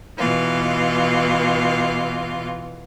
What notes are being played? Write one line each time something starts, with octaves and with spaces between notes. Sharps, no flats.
B2 E3 F4